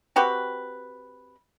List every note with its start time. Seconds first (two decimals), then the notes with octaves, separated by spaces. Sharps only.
0.16 C4 F#4 G4 B4